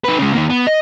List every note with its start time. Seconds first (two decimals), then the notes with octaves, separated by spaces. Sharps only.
0.05 D#4 B4
0.18 C#3 G#3
0.34 D#3 A#3
0.50 B3
0.67 D#5